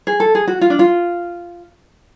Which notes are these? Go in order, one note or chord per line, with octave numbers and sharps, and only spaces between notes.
G#4
A4
G#4
F#4
F4
D4
F4